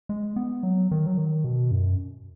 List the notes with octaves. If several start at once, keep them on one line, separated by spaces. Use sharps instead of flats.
G#3
B3
F#3
D#3
F#3
D#3
B2
F#2